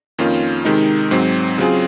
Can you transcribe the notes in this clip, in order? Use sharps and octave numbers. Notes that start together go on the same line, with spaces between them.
F2 D#3 A#3 C#4 F4
C3 D#3 G#3 D#4
G#2 F#3 C4
C#3 F#3 C4 F4 G#4